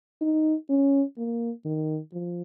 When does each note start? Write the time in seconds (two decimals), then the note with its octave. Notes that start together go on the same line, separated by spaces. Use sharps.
0.21 D#4
0.69 C#4
1.18 A#3
1.65 D#3
2.13 F3